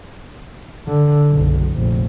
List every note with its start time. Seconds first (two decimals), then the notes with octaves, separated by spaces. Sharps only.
0.88 D3
1.31 F#1 B1
1.76 F1 A#1